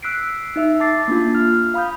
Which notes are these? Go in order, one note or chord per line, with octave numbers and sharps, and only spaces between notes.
E6 F#6 B6 C7 D7
D#4 E5 E6
A5 D6 A6 C7
A#3 D4 F4
F6
F5 B5 D#6 G6